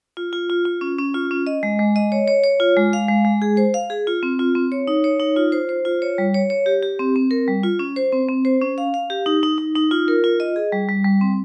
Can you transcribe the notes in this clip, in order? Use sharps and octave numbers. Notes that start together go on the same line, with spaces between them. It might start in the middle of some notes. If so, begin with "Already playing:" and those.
F4
F4
F4
F4
C#4
C#4
F4
C#4
D#5
G#3
G#3
D#5
C#5
C#5
C#5
F4
G#3
F5
G#3
G#3
G#4
C5
F5
G#4
F4
C4
F4
C4
C#5
D#4
C#5
D#4
F4
C5
C5
F4
C#5
G3
C#5
C#5
G4
G4
C4
C4
A#4
G3
F4
C#4
C5
C4
C4
C5
C#4
F5
F5
G4
D#4
D#4
D#4
D#4
F4
A#4
F4
D#5
G#4
G3
G3
G3
C4